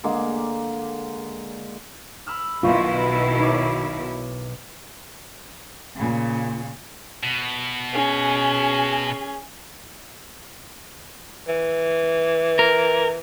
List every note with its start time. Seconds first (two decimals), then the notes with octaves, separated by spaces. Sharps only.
0.04 D3 G#3 A#3
2.26 B5 E6 F6
2.63 B1 B2 D#3 E4 F4 C#6
3.40 D#4 C#5 D6
5.96 A#2 C#3
7.23 B2
7.93 C#4 G#4
11.48 E3
12.59 A#4